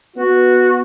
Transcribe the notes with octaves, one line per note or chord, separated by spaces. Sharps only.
B3 F#4